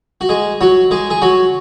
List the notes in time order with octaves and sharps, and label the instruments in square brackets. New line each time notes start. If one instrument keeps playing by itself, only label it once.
[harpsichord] F#4
G#3 G#4
F#3 F#4
G#3 G#4
G#4
F#3 F#4